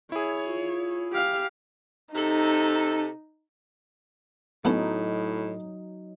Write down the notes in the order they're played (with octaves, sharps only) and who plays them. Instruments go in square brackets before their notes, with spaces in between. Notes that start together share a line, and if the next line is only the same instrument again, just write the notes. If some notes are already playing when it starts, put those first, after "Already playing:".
[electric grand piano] E4 G#4 [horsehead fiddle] C#5
[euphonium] F4
[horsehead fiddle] G4 F5
[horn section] C3 A4 [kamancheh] D#4
[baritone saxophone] A2 [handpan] F#3 D#4 [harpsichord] A3 B3 C#4